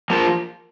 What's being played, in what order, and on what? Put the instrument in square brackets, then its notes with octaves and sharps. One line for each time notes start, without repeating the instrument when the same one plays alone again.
[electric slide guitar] F3 A#3